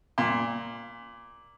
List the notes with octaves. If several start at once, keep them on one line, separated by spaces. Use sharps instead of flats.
A#2